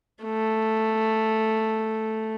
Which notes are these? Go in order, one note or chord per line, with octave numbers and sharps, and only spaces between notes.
A3